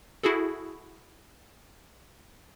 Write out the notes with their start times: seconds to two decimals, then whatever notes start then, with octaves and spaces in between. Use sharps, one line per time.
0.23 E4 F#4 G#4 A4